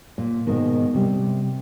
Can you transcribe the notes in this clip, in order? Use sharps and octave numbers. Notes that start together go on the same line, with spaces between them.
A#2
G#2 B2 D#3
C3 G3